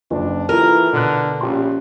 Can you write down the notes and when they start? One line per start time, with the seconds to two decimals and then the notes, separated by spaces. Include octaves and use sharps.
0.11 F#1 D4
0.49 E3 E4 F4 A4 A#4
0.92 B2 D3 F#6
1.41 A#1 C#4 G4 C6